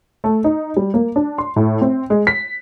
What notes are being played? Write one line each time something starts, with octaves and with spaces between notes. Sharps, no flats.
A3
D#4
G3
A#3
D4
C6
A2
C4
G#3
B6